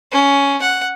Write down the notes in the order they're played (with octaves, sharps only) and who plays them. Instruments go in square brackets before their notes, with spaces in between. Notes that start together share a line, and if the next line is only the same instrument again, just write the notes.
[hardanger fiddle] C#4
F#5